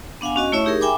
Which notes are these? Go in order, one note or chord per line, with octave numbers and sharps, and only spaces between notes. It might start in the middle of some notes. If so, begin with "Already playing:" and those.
B3 D4 F5 F#5 G#5
C#4 F#4 D#5
A3 E4 C#5 E5 C#6
D#4 G4 G#4 A#4
E5 G5 G#5 B5 D6